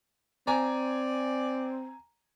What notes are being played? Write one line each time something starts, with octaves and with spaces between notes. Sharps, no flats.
C4 D5 G#5 A#5